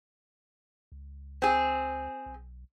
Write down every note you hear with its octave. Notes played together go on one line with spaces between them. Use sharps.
C#2
C4 G#4
B1